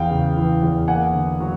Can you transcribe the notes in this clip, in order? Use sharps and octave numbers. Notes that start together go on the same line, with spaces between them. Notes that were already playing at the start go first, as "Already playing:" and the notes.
Already playing: E2 F5 G5
C#3
E3
E2
A#3 F#5 G#5
D3
F#3